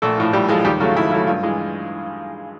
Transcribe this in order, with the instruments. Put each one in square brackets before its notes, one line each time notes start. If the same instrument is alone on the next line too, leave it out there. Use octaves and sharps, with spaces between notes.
[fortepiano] A#1 A3 A4
A2 F3
A#1 G3 G4
A2 F3 G#3 G#4
D#2 G3 G4
C#3 F#3 A3 F4
D#2 E4
C#3 F#3 A3 E4
G2 F4
E3 G#3